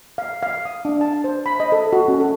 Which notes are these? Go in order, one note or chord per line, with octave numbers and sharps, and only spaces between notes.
F5
F5
D#6
D4
A5
C5
B5
D#5
A4
F#4
C#4
A4